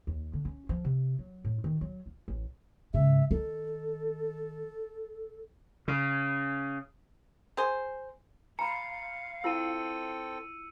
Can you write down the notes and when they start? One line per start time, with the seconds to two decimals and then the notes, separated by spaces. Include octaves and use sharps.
0.07 D#2
0.33 D3
0.45 C#4
0.69 F3
0.85 C3
1.19 F#3
1.45 A2
1.64 D#3
1.81 F#3
2.06 F4
2.28 A1
2.94 G#2 C#3 E5
3.31 D#3 A4
5.88 C#3
7.57 G#4 C5
8.59 F5 A#5 B5 C#7
9.44 C4 E4 F4 A4 G5 E6 D#7